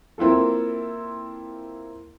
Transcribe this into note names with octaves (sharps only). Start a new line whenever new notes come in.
A#3 C4 E4 F4 A4